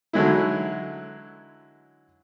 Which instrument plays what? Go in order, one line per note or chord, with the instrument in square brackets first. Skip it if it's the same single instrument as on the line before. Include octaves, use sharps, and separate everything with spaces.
[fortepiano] D3 E3 F#3 G#3 D#4 E4